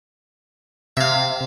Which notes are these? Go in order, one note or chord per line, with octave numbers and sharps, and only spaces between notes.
C3 E5 F5